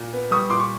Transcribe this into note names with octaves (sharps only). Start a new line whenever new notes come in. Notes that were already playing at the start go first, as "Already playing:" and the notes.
Already playing: A#2
B3
G3 C#6 D#6
A#2 C6 D6
C#6